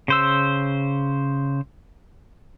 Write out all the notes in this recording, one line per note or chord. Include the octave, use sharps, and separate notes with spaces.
C#3 C5 E6